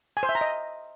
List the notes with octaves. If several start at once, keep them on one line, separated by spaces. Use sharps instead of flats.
G#5
C5
E5
A#5
D#5